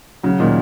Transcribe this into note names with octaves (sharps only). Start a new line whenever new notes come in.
C#3 F#3
A#2 D#3